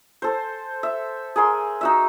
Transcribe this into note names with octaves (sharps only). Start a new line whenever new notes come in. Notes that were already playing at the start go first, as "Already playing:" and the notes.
A4 C5
E5
G#4 A#4 C6
D#4 F#4 E5